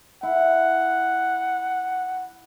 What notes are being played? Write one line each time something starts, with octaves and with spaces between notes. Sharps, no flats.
E4 F#5